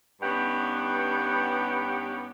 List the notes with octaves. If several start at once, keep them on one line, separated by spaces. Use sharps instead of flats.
G2 B3 C#4 D#4 G4 F#5